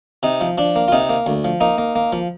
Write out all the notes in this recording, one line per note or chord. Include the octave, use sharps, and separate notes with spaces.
C3 D#4
F3
F3 D4
A#3
F4
C3 D#4
A#3
D2
F3
A#3 D#4
A#3
A#3
F3